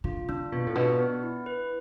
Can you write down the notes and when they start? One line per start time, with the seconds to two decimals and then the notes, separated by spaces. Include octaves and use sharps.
0.04 D3 F4
0.29 D3 D4
0.52 B2 F4
0.67 A2
0.75 B2 D4
0.99 B3
1.23 E4
1.46 B4